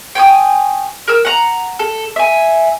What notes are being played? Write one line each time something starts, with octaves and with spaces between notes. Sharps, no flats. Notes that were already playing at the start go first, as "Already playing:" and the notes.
G5 G#5 C#6 D#6
A#4 E6
F#5 A#5
A4
E5 G#5